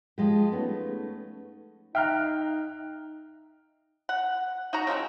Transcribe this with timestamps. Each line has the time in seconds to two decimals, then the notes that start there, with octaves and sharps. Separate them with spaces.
0.18 F3 G#3 G4
0.52 A3 B3 C#4 D#4
1.95 D#4 E5 F5 G5 A#5 F6 F#6
4.09 F#5
4.73 D#4 F#4 A#5
4.87 C#3 F3 G#3 C4